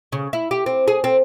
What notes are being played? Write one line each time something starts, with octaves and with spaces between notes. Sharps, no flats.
C#3
E4
G4
C4
G#4
C4